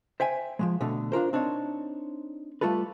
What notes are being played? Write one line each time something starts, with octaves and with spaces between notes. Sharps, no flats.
C5 E5 G5 G#5
F3 F#3 G#3
B2 D3 A3
D4 F4 A#4 C5
C4 D4 D#4 C#5
G3 A3 F4 A4 B4